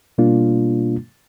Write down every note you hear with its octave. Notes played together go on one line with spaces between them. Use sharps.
B2 G3 A#3 D4 F4